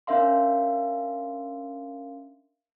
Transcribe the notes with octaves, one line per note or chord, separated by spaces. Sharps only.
C#4 D4 A#4 E5 F5 C6